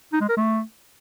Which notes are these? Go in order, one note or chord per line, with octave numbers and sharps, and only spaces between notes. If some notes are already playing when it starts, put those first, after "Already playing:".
D#4
G#3
A#4
A3